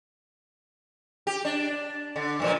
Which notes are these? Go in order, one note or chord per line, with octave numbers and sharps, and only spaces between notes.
G4
D4
D3
G2 A#2 F3